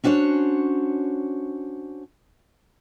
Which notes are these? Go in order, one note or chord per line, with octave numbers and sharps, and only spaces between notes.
C#4 D4 F#4 C5 C#5